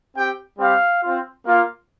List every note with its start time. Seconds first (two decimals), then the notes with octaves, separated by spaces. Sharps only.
0.15 C4 G4 G5
0.59 G3 C4 G4 F5
1.03 C4 F4
1.45 A#3 F4